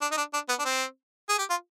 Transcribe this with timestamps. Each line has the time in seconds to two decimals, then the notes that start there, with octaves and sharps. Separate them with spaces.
0.01 D4
0.11 D#4
0.17 D4
0.33 D4
0.49 B3
0.59 D4
0.65 C4
1.29 G#4
1.39 G4
1.50 F4